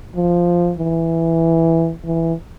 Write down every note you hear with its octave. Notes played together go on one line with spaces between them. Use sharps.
F3
E3
E3